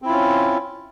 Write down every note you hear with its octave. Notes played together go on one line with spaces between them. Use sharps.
C4 C#4 E4 F4